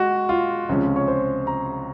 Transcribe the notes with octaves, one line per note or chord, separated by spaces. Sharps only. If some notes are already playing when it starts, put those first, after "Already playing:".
Already playing: G#3 F#4
F4
C#2 C3 F3 G#3 C#4
C#5
C5
A#5